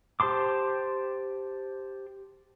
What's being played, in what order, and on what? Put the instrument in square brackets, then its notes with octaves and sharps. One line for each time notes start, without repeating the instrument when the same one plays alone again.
[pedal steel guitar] G4 C5 A5 C6 D6